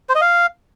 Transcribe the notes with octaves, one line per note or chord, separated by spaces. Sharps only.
C5
D#5
F5